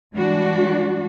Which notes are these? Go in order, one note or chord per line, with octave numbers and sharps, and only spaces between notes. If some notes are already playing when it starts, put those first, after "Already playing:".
E3 G3 G#3 D4 F#4